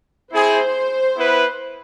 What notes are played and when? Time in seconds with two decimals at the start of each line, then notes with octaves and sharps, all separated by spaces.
0.32 C4 E4 G#4 C5
1.16 B3 E4 B4